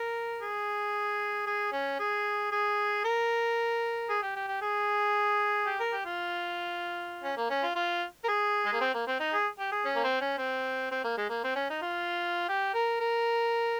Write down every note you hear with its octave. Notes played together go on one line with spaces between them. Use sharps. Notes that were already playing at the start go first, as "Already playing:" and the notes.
Already playing: A#4
G#4
G#4
C#4
G#4
G#4
A#4
G#4
G4
G4
G4
G#4
G4
A#4
G4
F4
C#4
A#3
C#4
F4
F4
A#4
G#4
G#3
A#3
C4
A#3
C4
D#4
G#4
G4
G#4
C#4
A#3
C4
C#4
C4
C4
A#3
G#3
A#3
C4
C#4
D#4
F4
G4
A#4
A#4